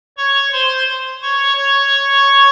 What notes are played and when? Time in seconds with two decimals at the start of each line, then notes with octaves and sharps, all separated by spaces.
0.17 C#5 C#6
0.52 C5 C6
1.22 C#5 C#6
1.57 C#5 C#6